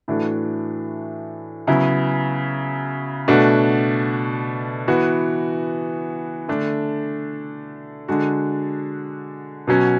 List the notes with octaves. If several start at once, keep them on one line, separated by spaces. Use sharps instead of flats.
A2 E3 A3 D4 F#4
C#3 F#3 B3 E4
B2 A3 D4 F#4
E3 B3 F#4
D3 A3 D4
D3 G#3 D4 F#4
B2 F#3 C#4 F#4